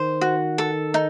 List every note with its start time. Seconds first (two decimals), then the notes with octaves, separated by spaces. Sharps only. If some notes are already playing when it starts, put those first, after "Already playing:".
Already playing: D#3 C5
0.21 F#4
0.58 A4
0.94 D#4